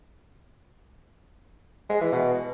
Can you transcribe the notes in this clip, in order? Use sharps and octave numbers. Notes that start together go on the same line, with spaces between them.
G#3
E3
B2